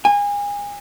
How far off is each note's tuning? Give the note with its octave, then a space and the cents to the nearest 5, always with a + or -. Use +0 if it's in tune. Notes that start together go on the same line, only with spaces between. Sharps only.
G#5 -30